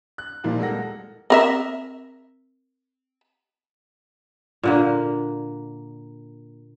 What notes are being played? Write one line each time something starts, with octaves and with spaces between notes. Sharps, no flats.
F#6
A#2 F3 G3 A#3 D#4
D#1 G#3 A4 A#4 F#5 A#6
C4 A#4 E5
A#2 D3 A#3